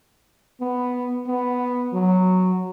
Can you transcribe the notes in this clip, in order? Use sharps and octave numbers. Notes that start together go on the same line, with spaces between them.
B3
B3
F#3